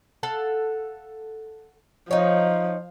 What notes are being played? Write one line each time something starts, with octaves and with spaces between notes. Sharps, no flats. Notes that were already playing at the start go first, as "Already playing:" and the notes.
A4 F5 F#5
F3 D#4 C#5